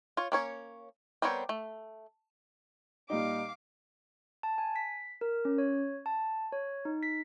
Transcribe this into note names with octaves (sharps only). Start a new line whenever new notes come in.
F4 C#5
A#3 C#4 C#5
G3 B3 C4 A#4 C#5
A3
A#2 G3 D#4 F5 D6
A5
G#5
B6
A#4
C#4
C#5
A5
C#5
D#4
B6